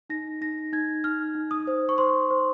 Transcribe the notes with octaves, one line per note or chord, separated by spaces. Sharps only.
D#4 A#6
D#4 A#6
D#4 G#6
D#4 F6
D#4
D#6
C5
C#6
C5 C6
C5